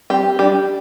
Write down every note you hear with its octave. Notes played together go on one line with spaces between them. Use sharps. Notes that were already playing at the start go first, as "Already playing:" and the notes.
G3 C4 G4
G3 D4 G4